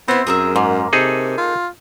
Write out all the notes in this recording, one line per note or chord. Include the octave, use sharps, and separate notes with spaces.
B3 C4 E4 C5
F#2 G#4 A#4 E5
G#2 A#3
C3 D#4 G#4 A4
F4